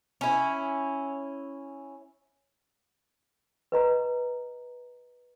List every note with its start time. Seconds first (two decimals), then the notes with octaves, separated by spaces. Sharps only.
0.21 C#4 E4
3.72 B4 D#5 A#5